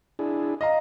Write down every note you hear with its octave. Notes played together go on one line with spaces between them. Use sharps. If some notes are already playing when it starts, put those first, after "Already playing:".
D4 E4 G#4
D#5 F5 A#5